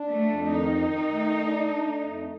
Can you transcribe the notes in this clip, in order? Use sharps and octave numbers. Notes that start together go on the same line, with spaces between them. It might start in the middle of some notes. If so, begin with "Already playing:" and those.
Already playing: D4
A3
F2
D#3 D#4
D#3
A3
D4
A3
F2